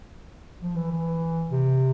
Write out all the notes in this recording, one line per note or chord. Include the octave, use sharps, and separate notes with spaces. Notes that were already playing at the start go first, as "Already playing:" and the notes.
F3
E3
E3
C3